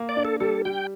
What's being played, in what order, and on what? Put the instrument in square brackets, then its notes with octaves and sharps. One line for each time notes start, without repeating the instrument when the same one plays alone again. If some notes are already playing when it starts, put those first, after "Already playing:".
Already playing: [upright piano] A#3
[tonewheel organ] D5
[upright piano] D4
[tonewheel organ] A4
[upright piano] G3 [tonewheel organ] A4
[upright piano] G3 [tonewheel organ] G5